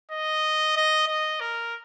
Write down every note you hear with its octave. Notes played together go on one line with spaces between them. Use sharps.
D#5
D#5
D#5
A#4